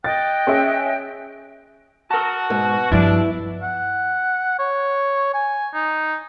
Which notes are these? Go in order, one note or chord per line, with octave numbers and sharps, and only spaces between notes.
D#5 G5 F#6 A6
C#4 G#4 E5
F#4 A#4 A5
G#2 B2
G2 F3 D4 E4
F#5
C#5
G#5
D#4